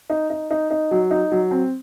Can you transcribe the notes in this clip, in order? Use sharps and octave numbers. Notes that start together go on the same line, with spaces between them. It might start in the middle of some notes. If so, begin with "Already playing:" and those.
D#4
D#4
D#4
D#4
F#3
D#4
F#3
C4